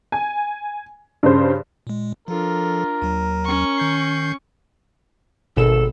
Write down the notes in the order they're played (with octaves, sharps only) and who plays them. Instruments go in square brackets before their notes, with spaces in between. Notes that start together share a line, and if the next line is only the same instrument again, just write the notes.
[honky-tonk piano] G#5
G2 C#3 C5
[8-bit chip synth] A#2 G#3
[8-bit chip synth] F3 A4 [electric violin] D4 F4 [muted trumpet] A#4
[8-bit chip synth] D#2 F#3
[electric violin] C#4 C#6
[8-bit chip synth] D#3 G6 C7
[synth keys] G#1 B2 E7 [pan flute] A4